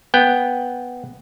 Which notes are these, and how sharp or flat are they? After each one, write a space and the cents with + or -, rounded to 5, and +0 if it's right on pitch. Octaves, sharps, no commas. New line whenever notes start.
B3 +0 G5 +10